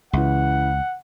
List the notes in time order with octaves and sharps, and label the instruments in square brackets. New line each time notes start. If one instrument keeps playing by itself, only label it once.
[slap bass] C#2 [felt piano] C#3 E3 [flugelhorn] F#5